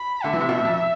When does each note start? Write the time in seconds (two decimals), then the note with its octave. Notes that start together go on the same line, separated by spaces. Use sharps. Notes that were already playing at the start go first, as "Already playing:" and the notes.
Already playing: B5
0.24 D3 E5
0.33 E3
0.40 C3
0.49 B2
0.57 A2
0.65 F2